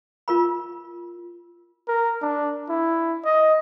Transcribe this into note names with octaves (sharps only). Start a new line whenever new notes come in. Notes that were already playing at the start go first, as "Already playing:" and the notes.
F4 A#4 B5
A#4
D4
E4
D#5